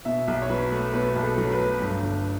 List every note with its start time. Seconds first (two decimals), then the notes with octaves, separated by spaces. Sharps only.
0.05 B2 E5
0.28 B1
0.42 C#5
0.49 F#3 B4
0.71 A3
0.93 B2 B4
1.16 B1
1.23 A4
1.38 F#3
1.53 B4
1.59 A3
1.82 G2
2.03 G1